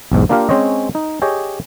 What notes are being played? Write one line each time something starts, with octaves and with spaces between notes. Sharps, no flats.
B1 E2 G#2
A#3 D4 F4 G4 A#4 F5
G#3 C4 C#4 C5 C#5 D#5
D#4
G4 G#4 C#5 D#5 G5